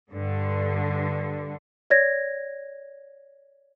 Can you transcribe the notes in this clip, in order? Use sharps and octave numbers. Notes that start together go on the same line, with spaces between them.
G2 D3
C#5 D5 G#6 A#6